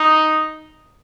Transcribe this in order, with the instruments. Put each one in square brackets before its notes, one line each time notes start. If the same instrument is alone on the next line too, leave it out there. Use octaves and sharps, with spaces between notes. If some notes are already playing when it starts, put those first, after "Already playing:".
Already playing: [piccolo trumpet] D#4